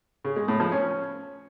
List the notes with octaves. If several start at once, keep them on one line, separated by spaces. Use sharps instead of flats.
C#3
G#3
A2
F3
C#4